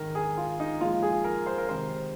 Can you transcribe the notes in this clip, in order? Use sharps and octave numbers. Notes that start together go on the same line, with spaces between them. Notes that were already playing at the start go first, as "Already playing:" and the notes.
Already playing: G#2 D#3 G#3 A#4
G#4
F4
D#4
A#2 F3 G#3 F4
G#4
A#4
C5
A#4
C3 D#3 G#3 C5